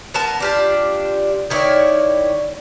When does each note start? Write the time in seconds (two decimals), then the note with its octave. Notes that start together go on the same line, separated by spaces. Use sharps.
0.14 B3 A#4 A5
0.40 D4 F4 G4
1.50 D#3 E4 C#5 D5